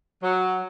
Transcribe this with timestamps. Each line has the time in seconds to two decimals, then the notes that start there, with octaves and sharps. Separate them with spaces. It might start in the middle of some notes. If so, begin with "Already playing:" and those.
0.22 F#3